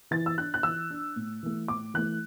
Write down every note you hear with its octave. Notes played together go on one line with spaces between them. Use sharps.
E3 A6
E6
D4 F#6
F#6
E3 E6
D4
A2
E3 A3
A2 D6
E3 A3 F#6